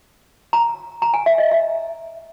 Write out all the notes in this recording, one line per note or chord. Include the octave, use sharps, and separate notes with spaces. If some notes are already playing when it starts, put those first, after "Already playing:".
A#5
A#5
G#5
E5
D#5
E5